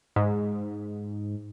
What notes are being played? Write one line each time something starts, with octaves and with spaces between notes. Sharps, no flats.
G#2